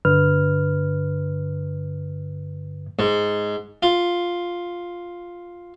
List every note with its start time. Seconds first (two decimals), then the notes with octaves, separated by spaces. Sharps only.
0.05 G2 D3 B4 F6
2.99 G#2
3.83 F4